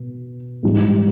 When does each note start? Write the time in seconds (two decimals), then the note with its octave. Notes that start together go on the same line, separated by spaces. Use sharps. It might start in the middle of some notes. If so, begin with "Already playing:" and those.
Already playing: B2
0.63 G#2 E3 G3